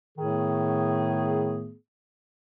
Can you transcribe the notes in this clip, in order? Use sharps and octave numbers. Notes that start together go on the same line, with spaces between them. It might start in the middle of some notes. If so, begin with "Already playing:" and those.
A2 D#3 A3 B3 G#4